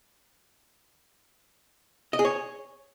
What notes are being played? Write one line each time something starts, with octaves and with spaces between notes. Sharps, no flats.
D#5
G#4
C#5